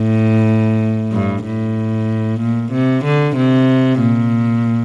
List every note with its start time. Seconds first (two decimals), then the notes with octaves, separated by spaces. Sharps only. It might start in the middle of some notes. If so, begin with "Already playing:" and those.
Already playing: A2
1.12 G2
1.45 A2
2.41 A#2
2.73 C3
3.05 D3
3.37 C3
4.01 A#2